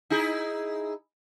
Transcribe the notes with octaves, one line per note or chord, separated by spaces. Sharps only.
D#4 E4 G#4